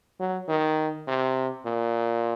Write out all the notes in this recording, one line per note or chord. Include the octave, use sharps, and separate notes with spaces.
F#3
D#3
C3
A#2